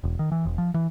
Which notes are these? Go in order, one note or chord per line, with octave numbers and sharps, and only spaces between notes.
E1
D#3
E3
E1
F3
E3